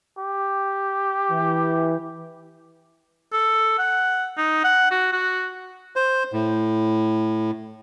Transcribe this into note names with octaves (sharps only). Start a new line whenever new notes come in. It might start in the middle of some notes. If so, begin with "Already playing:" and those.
G4
E3
A4
F#5
D#4
F#5
F#4
F#4
C5
A2